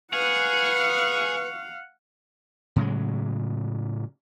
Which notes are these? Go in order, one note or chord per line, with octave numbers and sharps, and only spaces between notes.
G#4 B4 F5 F#5 C#6
A2 C#3 F#3 G#3